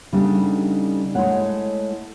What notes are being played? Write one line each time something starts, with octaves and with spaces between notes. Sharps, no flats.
C#3 G3 A3 B3 D4 D#4
G#3 A3 E4 C#5 F#5